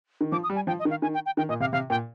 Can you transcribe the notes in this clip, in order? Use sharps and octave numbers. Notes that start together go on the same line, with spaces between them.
D#3
F3 D6
D#6
G3
G#5
F3 G5
D#5
D#3
F5
D#3 G#5
G5
G5
D#3 G5
A#2 D#5
C3 F5
C3 F5
A#2 G5